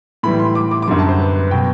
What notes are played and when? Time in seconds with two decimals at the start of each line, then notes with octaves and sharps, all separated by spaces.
0.23 A2 E3 G3 B5
0.40 C6
0.55 D6
0.71 D6
0.82 D6
0.88 F#2 D3 G3 C6
0.99 A5
1.09 C5
1.20 B4
1.35 B4
1.51 B2 F#3 G5